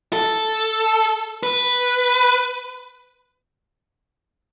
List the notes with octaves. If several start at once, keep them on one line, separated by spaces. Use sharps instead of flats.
A4
B4